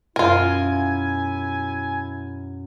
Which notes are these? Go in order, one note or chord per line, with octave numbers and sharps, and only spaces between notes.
F#2 B2 E4 F4 A#4 G#5